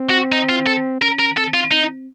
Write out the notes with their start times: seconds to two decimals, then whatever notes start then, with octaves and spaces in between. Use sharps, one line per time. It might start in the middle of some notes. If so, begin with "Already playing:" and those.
Already playing: C4
0.10 F#4
0.32 D#4
0.49 F4
0.67 A4
1.02 C#4 A#4
1.19 A#4
1.37 C4 A4
1.54 F4
1.71 C4 D#4